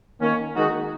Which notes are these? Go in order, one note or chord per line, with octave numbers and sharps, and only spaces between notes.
D#3 A#3 C#4
D#3 G#3 D#4 F#4